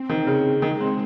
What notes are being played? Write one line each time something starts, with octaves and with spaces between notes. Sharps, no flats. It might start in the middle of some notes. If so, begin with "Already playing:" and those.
Already playing: C4
D#3
C#3
D#3 G#3
C4